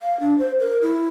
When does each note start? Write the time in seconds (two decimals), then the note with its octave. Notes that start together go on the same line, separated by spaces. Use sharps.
0.01 F5
0.20 D4
0.38 C5
0.60 A#4
0.82 E4